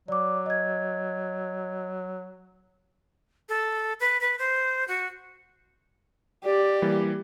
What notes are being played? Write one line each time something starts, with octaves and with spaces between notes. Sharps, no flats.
F#3 D5 D6
D#5 G#6
A4
B4
B4
C5
F#4
G4 D5
E3 G3 A#3